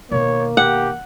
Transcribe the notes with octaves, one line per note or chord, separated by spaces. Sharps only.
B2 D#3 A#3 C#5
G4 F#5